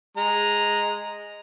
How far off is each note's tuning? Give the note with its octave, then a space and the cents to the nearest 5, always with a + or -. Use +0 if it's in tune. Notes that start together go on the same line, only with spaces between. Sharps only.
G#3 -5 A#5 +0